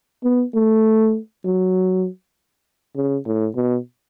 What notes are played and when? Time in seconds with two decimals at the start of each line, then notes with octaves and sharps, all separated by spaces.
0.24 B3
0.54 A3
1.44 F#3
2.96 C#3
3.26 A2
3.56 B2